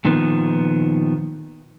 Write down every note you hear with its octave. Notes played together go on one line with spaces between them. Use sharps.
A#2 D#3 F3 B3